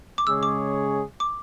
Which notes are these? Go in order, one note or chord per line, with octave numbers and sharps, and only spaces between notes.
D6
C#3 G#3 C#4 G#4 C#5 E6
D6
D6